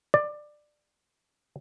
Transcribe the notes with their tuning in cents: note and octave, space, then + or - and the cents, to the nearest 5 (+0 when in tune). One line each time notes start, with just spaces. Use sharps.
D5 +20